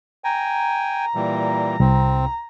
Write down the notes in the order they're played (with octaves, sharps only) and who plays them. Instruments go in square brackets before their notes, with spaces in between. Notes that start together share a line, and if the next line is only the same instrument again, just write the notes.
[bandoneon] G5 G#5 [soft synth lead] A#5
[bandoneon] A#2 E3 G3
[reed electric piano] C2 [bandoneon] C4